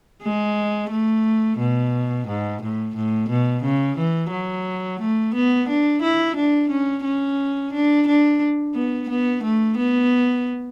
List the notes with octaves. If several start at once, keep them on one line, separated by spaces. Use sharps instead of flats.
G#3
A3
B2
G#2
A2
A2
B2
C#3
E3
F#3
A3
B3
D4
E4
D4
C#4
C#4
D4
D4
B3
B3
A3
B3